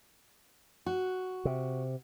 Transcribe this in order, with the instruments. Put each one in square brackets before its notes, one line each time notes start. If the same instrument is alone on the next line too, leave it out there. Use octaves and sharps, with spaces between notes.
[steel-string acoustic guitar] F#4
[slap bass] C3